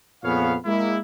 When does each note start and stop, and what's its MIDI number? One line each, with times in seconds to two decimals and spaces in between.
0.23 0.55 41
0.23 0.55 46
0.23 0.55 59
0.23 0.55 68
0.23 0.55 73
0.23 0.55 77
0.65 0.98 56
0.65 0.98 58
0.65 0.98 64